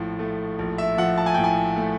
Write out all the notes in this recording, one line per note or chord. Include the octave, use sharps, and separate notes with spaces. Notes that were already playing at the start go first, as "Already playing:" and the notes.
Already playing: A#1 A2 F3
A3
A#1
E5
F3 F#5
A5
G#5
A2 G5
G#5
A3